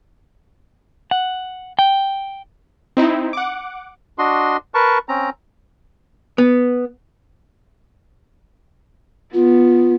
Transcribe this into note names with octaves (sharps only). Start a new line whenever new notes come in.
F#5
G5
C4 D#4 E4
F#5 D6
D4 F#4 D#5 C6
A#4 B4 A5 C#6
C4 C#4 A#5
B3
B3 F4